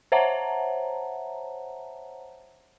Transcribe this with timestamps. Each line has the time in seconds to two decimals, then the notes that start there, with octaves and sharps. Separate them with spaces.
0.12 C5 C#5 E5 F#5 A5 A#5